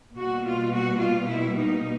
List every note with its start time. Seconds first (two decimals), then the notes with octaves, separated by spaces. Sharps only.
0.16 B2 G3 A#3 F#4
0.45 F4
0.73 F#4
1.00 F4
1.28 E4
1.57 D#4